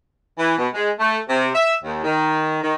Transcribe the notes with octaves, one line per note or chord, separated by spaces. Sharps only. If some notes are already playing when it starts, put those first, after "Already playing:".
E3
B2
G#3
A3
C3
E5
D#2
D#3
D#3